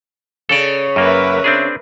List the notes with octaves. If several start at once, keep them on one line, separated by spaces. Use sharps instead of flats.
C#3 C#4 A4 D5
F#2 A#3 A#4 B4 E5
C4 D4 G#4